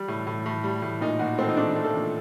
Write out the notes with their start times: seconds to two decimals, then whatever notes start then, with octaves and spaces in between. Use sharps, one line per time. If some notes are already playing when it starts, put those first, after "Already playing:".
Already playing: G3
0.08 A2
0.27 A2
0.46 A2
0.64 G3
0.82 A2
1.01 A#2 D#4
1.19 A#2 F#4
1.38 A3 C4
1.49 D#4
1.57 A3 D4
1.75 A3
1.85 A4
1.94 A#2